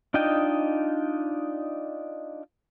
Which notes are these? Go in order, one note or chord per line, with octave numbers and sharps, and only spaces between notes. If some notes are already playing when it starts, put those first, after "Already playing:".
D4 D#4 F4 D#5 G5